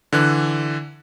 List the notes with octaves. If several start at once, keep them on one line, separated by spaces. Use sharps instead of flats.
D3 E3 F#6